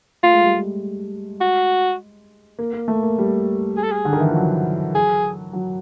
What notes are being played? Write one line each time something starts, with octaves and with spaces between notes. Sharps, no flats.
A3 F4
G#3
G3
G#3
F#4
A#3
A#3
A3
A#3
G3
G#4
A4
G#4
D3
D#3
E3
F3
F#3
G#4
F#3